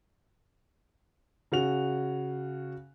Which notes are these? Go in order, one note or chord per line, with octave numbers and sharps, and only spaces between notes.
C#3 F#4 F7